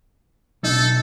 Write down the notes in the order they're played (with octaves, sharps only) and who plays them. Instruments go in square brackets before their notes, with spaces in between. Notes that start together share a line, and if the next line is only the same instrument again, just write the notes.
[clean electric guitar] B1 D#4 [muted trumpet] A4